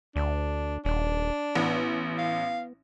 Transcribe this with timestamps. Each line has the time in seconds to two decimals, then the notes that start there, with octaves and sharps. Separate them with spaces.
0.16 D2 D4
0.85 D#1 D4
1.55 A1 B3
2.18 F5